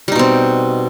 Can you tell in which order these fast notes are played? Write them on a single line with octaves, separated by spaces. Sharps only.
G3 D#4 B2 C4